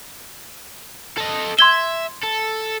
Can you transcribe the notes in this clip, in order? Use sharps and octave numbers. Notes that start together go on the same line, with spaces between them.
A4 D#5
E5 C6 G#6 G7
A4